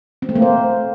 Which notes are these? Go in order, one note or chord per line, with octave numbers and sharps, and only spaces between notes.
C4
A3
A#3
C5